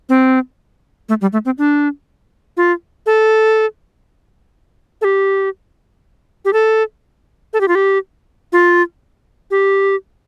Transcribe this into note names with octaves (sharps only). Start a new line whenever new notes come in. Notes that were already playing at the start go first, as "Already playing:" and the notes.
C4
A3
G3
A3
C4
D4
F4
A4
A4
G4
G4
A4
A4
G4
F4
G4
F4
G4